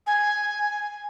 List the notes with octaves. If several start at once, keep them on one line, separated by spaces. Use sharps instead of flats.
G#5